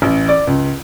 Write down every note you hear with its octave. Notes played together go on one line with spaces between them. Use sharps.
A1
D5
C#2